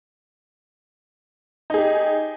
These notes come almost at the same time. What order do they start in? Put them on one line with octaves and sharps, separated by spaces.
D#4 G#4 G4